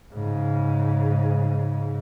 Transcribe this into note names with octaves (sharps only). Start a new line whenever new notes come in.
G#2 C#3